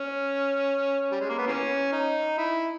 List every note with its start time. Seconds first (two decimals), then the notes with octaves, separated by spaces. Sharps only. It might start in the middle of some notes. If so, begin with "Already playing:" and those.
Already playing: C#4
1.12 G3
1.20 G#3
1.29 A#3
1.38 B3
1.47 E3 A#3 C#4
1.92 D#4
2.38 E4